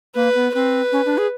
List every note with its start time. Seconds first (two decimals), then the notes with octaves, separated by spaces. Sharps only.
0.15 A#3 B4
0.35 B3
0.54 C4 B4
0.92 C#4
1.06 D4
1.18 G#4